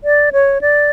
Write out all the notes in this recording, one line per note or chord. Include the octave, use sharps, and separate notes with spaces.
D5
C#5
D5